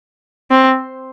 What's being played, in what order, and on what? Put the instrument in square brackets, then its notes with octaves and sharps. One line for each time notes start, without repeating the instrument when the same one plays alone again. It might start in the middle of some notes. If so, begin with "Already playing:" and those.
[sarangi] C4